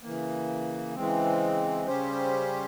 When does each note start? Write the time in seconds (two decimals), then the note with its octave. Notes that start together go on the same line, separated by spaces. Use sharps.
0.03 C#3 E3 A#3
0.95 C#3 E3 G#3 C4
1.87 C#3 G3 C#4 G4 C5